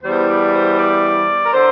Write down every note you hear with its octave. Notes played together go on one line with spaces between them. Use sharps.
E2 E3 G3 C5
D5
C5
D5
A#4
D3 C5